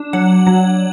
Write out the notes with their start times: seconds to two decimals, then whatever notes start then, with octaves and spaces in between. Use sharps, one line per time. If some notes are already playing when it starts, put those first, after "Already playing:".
Already playing: D4
0.13 F#3 F#5
0.47 F#3